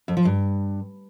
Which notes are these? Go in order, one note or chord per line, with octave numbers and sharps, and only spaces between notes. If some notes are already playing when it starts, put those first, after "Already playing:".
F2
F3
G2